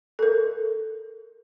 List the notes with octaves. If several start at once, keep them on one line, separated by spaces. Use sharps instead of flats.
A4 A#4